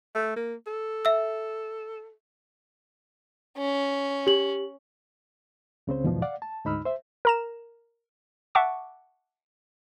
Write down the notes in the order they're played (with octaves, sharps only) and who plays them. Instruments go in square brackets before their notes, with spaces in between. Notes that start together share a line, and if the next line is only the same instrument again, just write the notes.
[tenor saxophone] A3
A#3
A4
[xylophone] E5 E6
[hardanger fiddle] C#4
[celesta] G4 F#7
[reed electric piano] C#2 C#3 C4 C5
E2 G#2 B2 D#3 F3
D5 F5 F#5
A5
D2 G#2 D#4 B5 E6 F6
C5 E5
[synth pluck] A#4 A#5 E7
E5 F#5 A5 C#6 D6